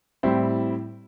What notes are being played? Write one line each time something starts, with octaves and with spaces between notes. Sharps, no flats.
A2 G3 C4 E4